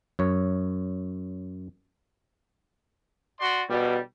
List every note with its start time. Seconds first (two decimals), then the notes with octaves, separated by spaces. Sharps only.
0.19 F#2 C#5
3.40 F#4 D5 C6
3.70 B2 G3